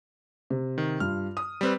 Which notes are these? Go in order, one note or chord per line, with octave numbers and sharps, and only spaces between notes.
C3
D#3
G2 F4 F6
D#6
G3 C4 B4